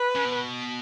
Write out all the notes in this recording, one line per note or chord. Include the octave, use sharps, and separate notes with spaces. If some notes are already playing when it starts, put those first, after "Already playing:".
Already playing: B4
C#3
B2